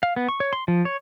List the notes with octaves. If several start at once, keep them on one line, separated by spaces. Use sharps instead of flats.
F5
B3
C#6
C#5
C6
F3
C#5